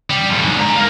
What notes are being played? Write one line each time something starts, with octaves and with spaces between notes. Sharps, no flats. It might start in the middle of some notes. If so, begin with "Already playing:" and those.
G3
F2 A2
G#2 D3
G#2 A#5
F4 A#4